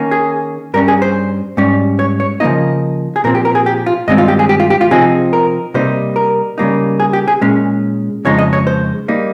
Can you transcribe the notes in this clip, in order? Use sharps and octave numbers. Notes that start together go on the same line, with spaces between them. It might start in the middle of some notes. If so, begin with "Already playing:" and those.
Already playing: D#3 A#3 C#4
G#4
G2 G3 C#4 A#4
G#4
C5
G#2 G3 C#4
C#5
C#5
C#3 F3 A#3 D#4 D#5
G#4
A#2 F3 C4 A#4
G4
A#4
G#4
G4
F4
G2 D#3 G#3 C4 D#4 D#5
F4
G4
G#4
G4
F4
G4
F4
C3 F3 C4 D#4 G#4
A#4
C3 G3 A#3 D#4 C5
A#4
C#3 G3 A#3 D#4
G#4
G4
G#4
A#2 G#3 C#4
F2 C#3 F3 G#3 D#4 C#5
D#5
C#5
C5
G3 A#3 D#4